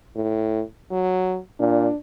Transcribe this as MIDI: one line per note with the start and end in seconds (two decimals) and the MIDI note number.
0.16 0.62 45
0.91 1.38 54
1.60 1.88 46
1.60 1.96 62